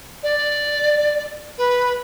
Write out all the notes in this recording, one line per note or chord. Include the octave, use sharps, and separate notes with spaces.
D5
B4